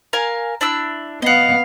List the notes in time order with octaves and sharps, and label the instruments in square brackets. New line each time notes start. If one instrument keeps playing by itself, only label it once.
[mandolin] A#4 F5 G#5
D4 E4 E6
[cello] B3 F5 [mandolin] D#5 F#5